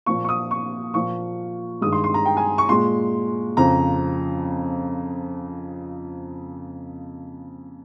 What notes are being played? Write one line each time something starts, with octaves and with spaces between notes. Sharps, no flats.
A#2 F3 A#3 C#6
C#6
D#6
C#6
A#2 F3 A#3 C#6
G2 D#3 G#3 D#6
C6
C6
A#5
G5
G#5
C#6
A#2 G#3 C6
F2 C#3 F3 A#5